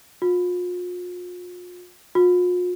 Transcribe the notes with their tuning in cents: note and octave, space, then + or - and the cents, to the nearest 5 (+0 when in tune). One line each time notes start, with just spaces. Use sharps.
F4 +40
F4 +45